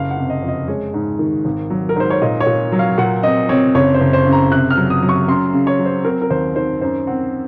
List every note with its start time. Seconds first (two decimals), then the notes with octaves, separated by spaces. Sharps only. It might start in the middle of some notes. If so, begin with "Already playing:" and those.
Already playing: F#1 F5
0.10 F#5
0.17 C3
0.30 D#5
0.42 F2
0.48 D#5
0.68 G#3 C#5
0.94 G#2
1.19 D#3
1.45 G#1
1.70 F#3
1.89 A#4
1.96 G#2 C5
2.10 C#5
2.21 A#2 D#5
2.40 C#5
2.46 A#2
2.72 F#3
2.79 F5
2.98 A#2 F#5
3.23 C4 D#5
3.49 C4 C#5
3.74 F#1 C#5
3.94 C5
4.00 F#1
4.13 C5
4.26 C#3
4.32 A#5
4.51 C3 F#6
4.70 F6
4.77 F#3
4.90 D#6
5.02 F#3
5.09 C#6
5.28 F#2 C6
5.53 C#3
5.67 C#5
5.79 F#3
5.86 C5
6.04 C4 A#4
6.22 A#4
6.30 D#2 C5
6.56 D#3 C5
6.81 F#2 C5
7.07 C4 F#5